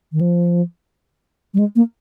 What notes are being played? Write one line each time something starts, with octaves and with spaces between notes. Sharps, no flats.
D#3
F3
G3
G#3
A#3